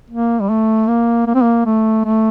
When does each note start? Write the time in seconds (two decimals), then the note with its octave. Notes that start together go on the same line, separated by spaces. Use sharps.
0.10 A#3
0.41 G3
0.49 A3
0.88 A#3
1.27 A#3
1.35 C4
1.42 A#3
1.66 A3
2.05 A3